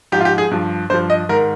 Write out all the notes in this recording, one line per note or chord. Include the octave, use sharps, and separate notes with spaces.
G#2 F3 G4
F4
G4
G#4
G2 F3
G2 F3 C5
D#5
G#2 D#3 A#4